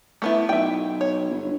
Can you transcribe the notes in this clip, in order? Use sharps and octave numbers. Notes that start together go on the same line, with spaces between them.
A3 B3 E4
B1 E5 G5
C#5
G1